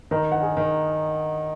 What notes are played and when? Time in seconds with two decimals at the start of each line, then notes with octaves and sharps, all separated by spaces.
0.11 D#3 A#4 A#5
0.32 F#5
0.41 G#4 G#5
0.57 D#3